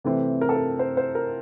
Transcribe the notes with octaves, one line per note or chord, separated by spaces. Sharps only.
C3 E3 A3 C4
A#4
A4
A#4
C5
C5
A#4